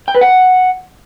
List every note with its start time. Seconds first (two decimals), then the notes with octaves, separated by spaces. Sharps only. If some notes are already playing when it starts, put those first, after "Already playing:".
0.08 G5
0.15 B4
0.21 F#5